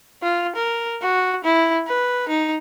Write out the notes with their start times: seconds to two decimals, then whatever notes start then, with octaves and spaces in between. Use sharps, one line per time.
0.22 F4
0.56 A#4
1.02 F#4
1.44 E4
1.88 B4
2.29 D#4